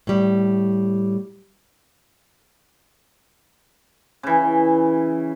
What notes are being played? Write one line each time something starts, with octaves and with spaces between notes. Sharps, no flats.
A2 G3
C#3 E3